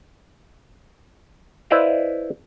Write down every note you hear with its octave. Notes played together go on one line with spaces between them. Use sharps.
E4 B4 C5 D5 D#5 F5